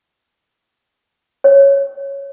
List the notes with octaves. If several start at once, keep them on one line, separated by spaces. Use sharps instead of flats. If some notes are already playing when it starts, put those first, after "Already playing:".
C#5